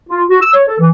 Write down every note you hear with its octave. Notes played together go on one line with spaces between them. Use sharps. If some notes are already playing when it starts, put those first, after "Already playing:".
F4
F#4
E6
C#5
A4
E3